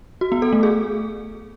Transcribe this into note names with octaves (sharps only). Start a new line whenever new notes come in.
F#4
B3
A4
A3
G#4